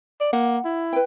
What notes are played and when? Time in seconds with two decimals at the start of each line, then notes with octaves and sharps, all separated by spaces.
0.21 D5
0.33 A#3 F#5
0.65 E4
0.93 B4 G5